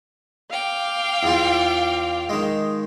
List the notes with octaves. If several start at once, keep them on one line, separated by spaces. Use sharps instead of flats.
F5 G5 D6
E2 F4
D#3 G#3